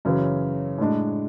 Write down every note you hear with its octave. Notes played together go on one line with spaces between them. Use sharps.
F#2 C#3 E3
A2 G#3 D4